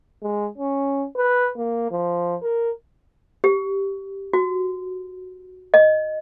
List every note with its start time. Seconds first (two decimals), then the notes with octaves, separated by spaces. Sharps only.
0.23 G#3
0.58 C#4
1.16 B4
1.57 A#3
1.91 F3
2.42 A#4
3.44 G4
4.33 F#4
5.74 D#5